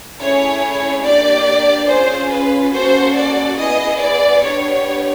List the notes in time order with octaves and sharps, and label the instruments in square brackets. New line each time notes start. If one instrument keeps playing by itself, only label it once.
[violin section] A3 C#4 E4 G#4 C#5
A#3 D4 G4 D5
C#4 F4 G#4 C5
B4
A#3 C#4 F#4 A4 C5
D5
B3 E4 G#4 D#5
D5
B3 D4 G4 C#5